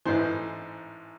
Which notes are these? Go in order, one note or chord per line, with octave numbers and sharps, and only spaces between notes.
A1 G#2 E3 C5